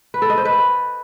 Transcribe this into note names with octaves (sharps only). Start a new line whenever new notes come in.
B4
A4
D#5
C5
B4